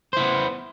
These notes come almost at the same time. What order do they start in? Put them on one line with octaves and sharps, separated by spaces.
C5 E4 B3